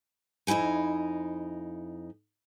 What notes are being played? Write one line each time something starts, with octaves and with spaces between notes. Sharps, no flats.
F2 D#4 E4 G5 G#5